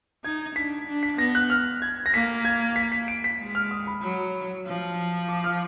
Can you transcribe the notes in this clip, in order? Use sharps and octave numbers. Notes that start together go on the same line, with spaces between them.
D#4 G#6
D4 B6
D4
B6
B3 A#6
F#6
F6
G#6
A#6
A#3 B6
G#6
B6
B6
D7
B6
G#3
F6
D#6
B5
F#3
F3
D6
F6